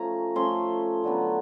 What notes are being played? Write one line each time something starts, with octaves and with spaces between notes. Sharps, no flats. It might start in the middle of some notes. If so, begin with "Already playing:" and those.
Already playing: F3 A3 C#4 A#5
F3 A3 C#4 C6
D3 F#3 B3